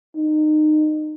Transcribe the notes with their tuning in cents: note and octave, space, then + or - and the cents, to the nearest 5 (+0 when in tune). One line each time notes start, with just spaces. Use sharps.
D#4 -25